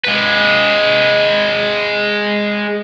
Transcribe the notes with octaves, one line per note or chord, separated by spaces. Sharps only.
G#3 B4